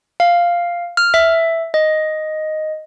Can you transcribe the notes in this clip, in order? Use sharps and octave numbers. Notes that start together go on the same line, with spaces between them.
F5
F6
E5
D#5